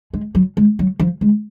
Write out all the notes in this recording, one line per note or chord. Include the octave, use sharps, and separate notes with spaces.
G#3
F#3
G#3
F#3
F3
G#3